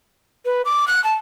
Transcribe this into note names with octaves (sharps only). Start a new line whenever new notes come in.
B4
D6
F#6
A5